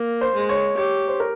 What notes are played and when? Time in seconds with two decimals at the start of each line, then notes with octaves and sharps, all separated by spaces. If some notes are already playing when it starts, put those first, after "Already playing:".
Already playing: A#3
0.21 C5
0.35 G#3
0.49 C#5
0.77 G4 C#5
1.08 C5
1.20 A#4